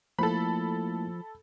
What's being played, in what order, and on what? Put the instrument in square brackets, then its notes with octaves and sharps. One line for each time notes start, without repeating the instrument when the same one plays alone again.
[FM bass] F3 [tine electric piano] A3 A#3 E4 [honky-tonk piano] A4 B5